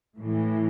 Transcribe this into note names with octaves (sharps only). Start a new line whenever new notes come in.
A2 E3